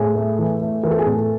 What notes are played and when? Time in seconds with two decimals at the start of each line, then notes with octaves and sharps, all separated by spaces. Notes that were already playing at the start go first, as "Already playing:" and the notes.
Already playing: A2 G#4
0.16 A3
0.39 E3
0.61 A3
0.83 E3 A#4
0.91 A4
0.99 G#4
1.05 A2 A4